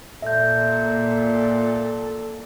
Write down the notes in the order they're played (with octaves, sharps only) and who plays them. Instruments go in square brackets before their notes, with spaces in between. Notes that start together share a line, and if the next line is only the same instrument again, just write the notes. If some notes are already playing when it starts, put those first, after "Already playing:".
[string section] A#2 [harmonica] A4 [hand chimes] E5 G6